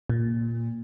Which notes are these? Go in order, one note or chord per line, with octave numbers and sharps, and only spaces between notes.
A#2